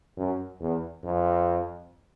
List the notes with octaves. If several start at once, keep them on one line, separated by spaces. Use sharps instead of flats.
F#2
E2
F2